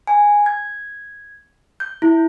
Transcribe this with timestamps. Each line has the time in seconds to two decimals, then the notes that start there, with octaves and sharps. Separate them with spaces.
0.07 G#5
0.46 G#6
1.80 G6
2.02 E4